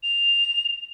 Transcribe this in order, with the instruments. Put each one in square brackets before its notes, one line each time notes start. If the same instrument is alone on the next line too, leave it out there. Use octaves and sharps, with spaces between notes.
[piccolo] F7